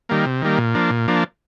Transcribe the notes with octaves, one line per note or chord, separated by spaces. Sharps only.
D#3 G3 A#3
C3
D#3 G3 A#3
A#2
F3 A#3 D4
A#2
F3 A#3 D4